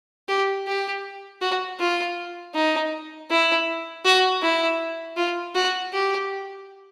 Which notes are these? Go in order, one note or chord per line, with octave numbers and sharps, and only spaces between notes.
G4
G4
F#4
F4
D#4
E4
F#4
E4
F4
F#4
G4